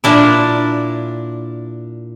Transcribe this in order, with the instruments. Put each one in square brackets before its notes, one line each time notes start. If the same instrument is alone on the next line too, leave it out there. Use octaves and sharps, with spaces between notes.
[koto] A#2 D4 E4